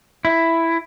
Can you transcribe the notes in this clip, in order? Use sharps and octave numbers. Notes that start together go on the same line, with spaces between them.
E4